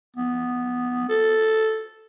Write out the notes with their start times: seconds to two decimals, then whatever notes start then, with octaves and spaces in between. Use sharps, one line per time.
0.16 B3
1.09 A4